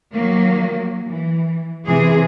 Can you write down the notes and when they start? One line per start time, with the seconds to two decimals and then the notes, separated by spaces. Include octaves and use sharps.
0.11 D#3 F#3 A#3
1.06 E3
1.87 C3 E3 G#4